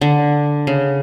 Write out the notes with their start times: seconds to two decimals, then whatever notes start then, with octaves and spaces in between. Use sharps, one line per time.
0.01 D3
0.67 C#3